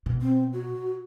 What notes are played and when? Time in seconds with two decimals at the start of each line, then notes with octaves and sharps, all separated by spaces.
0.06 B2
0.22 C4
0.53 F#4